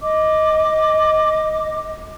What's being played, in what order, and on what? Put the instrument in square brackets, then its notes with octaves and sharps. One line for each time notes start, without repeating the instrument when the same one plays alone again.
[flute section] D#5 D6